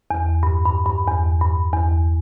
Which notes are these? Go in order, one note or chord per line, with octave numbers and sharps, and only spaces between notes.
E2
G2
G2
G2
E2
G2
E2